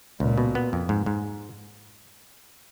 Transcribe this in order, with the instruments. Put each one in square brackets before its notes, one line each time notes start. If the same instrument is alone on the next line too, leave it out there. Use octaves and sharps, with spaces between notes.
[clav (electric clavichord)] C#2 [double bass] A#2
[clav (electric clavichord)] B2
B3
F2
G#2
G#2